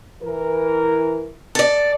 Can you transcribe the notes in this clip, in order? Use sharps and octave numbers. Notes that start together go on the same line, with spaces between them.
E3 A#4
A4 D5